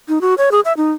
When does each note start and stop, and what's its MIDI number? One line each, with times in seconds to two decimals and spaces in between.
0.09 0.21 63
0.21 0.34 66
0.38 0.49 73
0.52 0.60 68
0.65 0.73 76
0.77 0.92 63